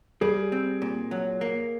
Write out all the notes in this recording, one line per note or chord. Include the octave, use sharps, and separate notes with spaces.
G3 G#4
C4
A#2
F#3
A#3